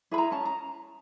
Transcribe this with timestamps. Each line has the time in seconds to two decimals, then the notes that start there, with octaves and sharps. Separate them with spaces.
0.11 E4 G#4 B4 B5
0.18 A#5
0.32 C#4 A5
0.45 A#5